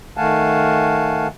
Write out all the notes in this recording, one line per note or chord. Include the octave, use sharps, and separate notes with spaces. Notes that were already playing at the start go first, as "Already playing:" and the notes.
D#3 A3 F5 F#5 G#5 A5